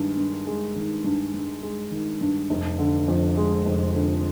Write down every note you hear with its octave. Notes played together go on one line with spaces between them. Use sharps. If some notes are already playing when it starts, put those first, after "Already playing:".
Already playing: G2 D#3 G#3
G2
G#3
D#3
G2
G2
G#3
D#3
G2
F1
D3
F2
G#3
F1
D3